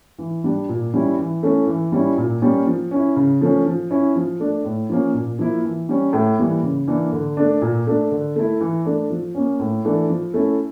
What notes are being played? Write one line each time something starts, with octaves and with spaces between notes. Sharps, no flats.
E3
G3 D4
A#2
G3 C#4 E4
E3
A3 C#4 E4
E3
G3 C#4 E4
A#2
G3 A#3 C#4
F3
C#4 E4
C#3
F3 A3 C#4
F3
C#4 E4
F3
A3 D4
A2
F3 A#3 C#4
A#2
F3 A#3 E4
E3
G3 C#4
A2
E3 G3 A#3
C#3
E3 A#3 D4
D3
A3 D4
A#2
A3 D4
D3
A3 E4
E3
A3 D4
F3
A#3 C#4
A2
E3 A3 D4
F3
A3 C#4 E4